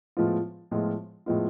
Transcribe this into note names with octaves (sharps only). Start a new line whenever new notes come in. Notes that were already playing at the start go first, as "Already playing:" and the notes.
A2 F3 G#3 B3 F4
A2 F3 G#3 B3 F4
A2 F3 G#3 B3 F4